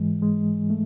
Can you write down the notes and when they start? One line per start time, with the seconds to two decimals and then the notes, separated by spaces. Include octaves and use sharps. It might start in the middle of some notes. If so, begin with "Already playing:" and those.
Already playing: G#2 E3 G#3
0.22 G#3
0.70 A3